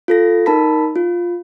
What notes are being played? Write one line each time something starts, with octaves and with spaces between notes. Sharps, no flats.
F4 A4 A#6
D#4 A#4 A5 B5 B6
F4